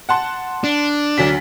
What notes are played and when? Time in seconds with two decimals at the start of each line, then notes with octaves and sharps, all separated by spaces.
0.09 F#5 A5 C6
0.64 D4
1.18 D2 F#3 B6